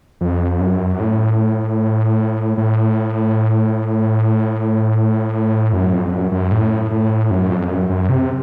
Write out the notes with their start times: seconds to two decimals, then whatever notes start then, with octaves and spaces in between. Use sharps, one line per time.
0.21 F2
0.60 F#2
1.00 A2
2.57 A2
5.73 F#2
5.93 F2
6.12 F#2
6.32 F#2
6.51 A2
6.91 A2
7.31 F#2
7.50 F2
7.70 F#2
7.89 F#2
8.09 C3